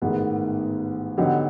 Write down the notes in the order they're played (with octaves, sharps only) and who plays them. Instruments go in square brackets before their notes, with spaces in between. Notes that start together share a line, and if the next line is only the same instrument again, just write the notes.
[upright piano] A1 G#2 D#3 G#3 B3
D3 F#3 B3 D#4 G4